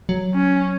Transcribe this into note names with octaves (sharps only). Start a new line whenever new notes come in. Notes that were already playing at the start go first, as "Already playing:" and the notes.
F#3
C#4